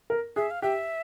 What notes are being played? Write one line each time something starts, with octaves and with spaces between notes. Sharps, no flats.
A#4
G#4 E5
F5
G4 E5